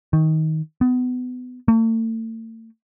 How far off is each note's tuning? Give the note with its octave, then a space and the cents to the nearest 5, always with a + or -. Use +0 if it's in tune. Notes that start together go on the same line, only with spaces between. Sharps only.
D#3 +20
B3 +25
A3 +40